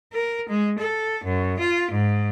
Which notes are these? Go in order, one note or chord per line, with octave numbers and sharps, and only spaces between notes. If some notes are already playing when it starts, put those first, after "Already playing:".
A#4
G#3
A4
F#2
F4
G#2